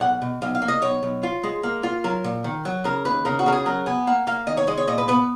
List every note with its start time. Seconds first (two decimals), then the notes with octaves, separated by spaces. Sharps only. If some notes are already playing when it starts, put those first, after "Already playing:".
0.01 B1 F#5
0.22 B2
0.42 B1 F5
0.55 F5
0.62 A#3
0.68 D#5
0.82 B1 C#5
1.03 B1
1.23 F4
1.43 G#3
1.63 A#3
1.83 F4
2.04 F#3 A#4
2.24 A#2
2.44 D#3
2.65 F#3
2.84 C#3 A#4
3.05 D#2 B4
3.25 C#3 A#4
3.39 F#4
3.46 C#3 A#4
3.52 G#4
3.66 F#3 A#4
3.86 B3 G#5
4.07 A#3 F#5
4.27 A#3 F5
4.47 D#3 D#5
4.57 C#5
4.67 G#3 D#5
4.77 C#5
4.87 A#2 D#5
4.98 B4
5.08 B3 B4